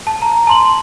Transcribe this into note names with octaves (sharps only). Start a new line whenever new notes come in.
A5
A#5
A5 C6 F#7